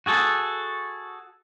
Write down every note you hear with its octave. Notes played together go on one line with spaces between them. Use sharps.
F#4 G#4 A4